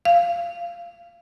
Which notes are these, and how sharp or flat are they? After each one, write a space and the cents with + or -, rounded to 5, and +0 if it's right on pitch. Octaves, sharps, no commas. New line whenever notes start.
F5 -15